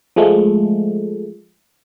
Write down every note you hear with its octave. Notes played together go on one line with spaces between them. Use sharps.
F3 G#3 A3